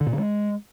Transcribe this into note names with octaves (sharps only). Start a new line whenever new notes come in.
D3
A#2
D3
G#3